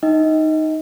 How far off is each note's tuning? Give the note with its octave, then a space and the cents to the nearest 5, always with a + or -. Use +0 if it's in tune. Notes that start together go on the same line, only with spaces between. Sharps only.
D#4 +0 D#5 +25 G5 +10